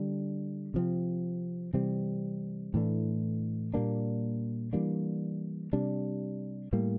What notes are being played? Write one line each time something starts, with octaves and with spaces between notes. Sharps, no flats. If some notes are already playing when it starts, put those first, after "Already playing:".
Already playing: D3 G3 D4
C3 F3 C4
C3 E3 G3 C4
A2 E3 A3 D4
A#2 G3 A#3 D4
E3 G3 A#3 D4
C3 G3 D4
A2 G3 A#3